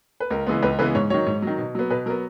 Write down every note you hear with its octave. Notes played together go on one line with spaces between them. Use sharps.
B4
C#2 A#4
C#3 E3 G#3 B3
C#2 B4
C#3 E3 G#3 B3 B4
G#2 C#5
D#3 F#3 C#5
G#2
D#3 F#3
B2
F#3 B3
B2 B4
F#3 B3 A#4